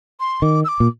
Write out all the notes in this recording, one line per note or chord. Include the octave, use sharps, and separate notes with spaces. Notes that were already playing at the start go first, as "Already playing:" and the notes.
C6
D#3 D6
E6
D6
A#2